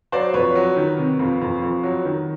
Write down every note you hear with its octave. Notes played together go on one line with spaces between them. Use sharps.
F#3 C5 D5
F2 B4 C#5
F#3
D#3
C3
F2
F2
F2
F#3
D#3